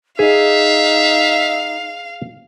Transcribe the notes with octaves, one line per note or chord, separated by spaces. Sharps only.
D#4 G#4 E5 F5